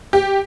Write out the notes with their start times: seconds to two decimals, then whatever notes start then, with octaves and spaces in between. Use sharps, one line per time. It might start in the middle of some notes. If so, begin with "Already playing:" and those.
0.13 G4